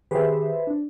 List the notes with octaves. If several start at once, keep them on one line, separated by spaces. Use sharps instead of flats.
D#3 G4 G#4 B4 C5 E5
D4